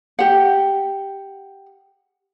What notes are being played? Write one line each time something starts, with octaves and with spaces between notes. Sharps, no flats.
G4 F#5